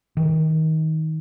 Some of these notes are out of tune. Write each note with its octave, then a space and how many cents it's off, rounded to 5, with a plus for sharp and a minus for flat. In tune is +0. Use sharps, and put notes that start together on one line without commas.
D#3 +25